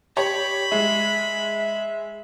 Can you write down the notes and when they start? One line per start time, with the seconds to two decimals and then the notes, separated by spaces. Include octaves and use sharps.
0.17 G4 C#5 B5
0.72 G#3 E5